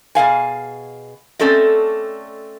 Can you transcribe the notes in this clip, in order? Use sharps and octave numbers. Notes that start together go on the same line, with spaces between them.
B2 G#4 F5 G#5
A3 C4 C#4 A4 D5 D#5